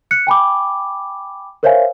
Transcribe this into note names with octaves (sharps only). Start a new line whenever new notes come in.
F#6 C#7
G5 G#5 B5 D6
A#4 C5 C#5 E5 F5 G#5